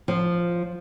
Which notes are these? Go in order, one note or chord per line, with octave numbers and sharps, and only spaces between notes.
F3